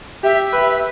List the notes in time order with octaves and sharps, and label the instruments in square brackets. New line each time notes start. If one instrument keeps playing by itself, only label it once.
[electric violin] G4 [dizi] E5
[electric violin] B4